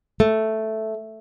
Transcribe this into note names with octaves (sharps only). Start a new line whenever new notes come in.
A3